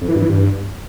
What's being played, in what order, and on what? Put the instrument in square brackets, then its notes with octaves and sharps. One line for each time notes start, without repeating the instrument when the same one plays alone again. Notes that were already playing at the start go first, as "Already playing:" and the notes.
[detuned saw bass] F2
E3
G2
E3
G2